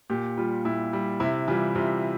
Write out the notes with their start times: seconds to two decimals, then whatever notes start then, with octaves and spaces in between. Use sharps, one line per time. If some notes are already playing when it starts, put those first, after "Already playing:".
0.10 A#2 G4
0.37 G3 F4
0.65 A#2 E4
0.93 G3
1.20 C3 E4
1.48 E3 G3 F4
1.75 C3 F4